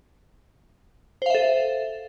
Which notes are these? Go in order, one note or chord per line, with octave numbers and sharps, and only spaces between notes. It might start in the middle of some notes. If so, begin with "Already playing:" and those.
A4 C5 E5 F5